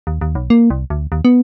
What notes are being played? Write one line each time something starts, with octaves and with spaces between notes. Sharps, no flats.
D#2
D#2
B1
A#3
C2
D2
D#2
B3